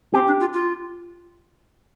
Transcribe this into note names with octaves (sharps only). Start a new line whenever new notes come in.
C4 G4
D4
F4
F4